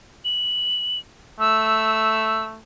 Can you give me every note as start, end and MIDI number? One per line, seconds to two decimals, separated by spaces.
0.25 0.99 102
1.40 2.61 57
1.40 2.45 88